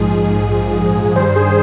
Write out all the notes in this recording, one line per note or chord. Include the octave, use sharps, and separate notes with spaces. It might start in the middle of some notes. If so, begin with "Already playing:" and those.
Already playing: A#1 G#2 F3 G#3 G#4
G2 D#3 G3 C5
G#4